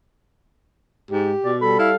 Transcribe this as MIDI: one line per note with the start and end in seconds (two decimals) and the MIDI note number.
1.11 1.34 44
1.11 1.51 67
1.45 1.78 47
1.45 1.56 74
1.62 1.95 55
1.62 1.95 69
1.62 1.75 83
1.79 1.91 64
1.79 1.96 77